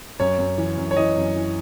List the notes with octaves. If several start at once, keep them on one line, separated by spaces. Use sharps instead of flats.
F#2 C#5
F#2
E3
F#2
C#5
E3 D#5
F#2
E3